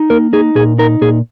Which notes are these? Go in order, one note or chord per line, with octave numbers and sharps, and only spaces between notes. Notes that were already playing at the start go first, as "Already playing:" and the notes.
Already playing: D#4
A#3 A#4
D#4 G#4
A#2 G#4
D#4 A#4
A#2 G#4